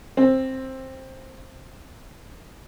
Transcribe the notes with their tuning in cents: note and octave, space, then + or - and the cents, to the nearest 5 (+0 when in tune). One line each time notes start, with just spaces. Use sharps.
C4 +10